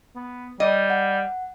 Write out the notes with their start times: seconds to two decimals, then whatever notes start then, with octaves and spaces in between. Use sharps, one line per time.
0.16 B3
0.60 G3 D#5
0.90 F#5